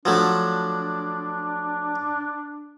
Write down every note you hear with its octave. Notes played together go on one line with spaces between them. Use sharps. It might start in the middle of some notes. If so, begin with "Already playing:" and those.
F3 F#3 A3 D4